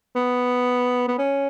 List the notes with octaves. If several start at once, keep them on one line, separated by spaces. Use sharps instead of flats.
B3
B3
C#4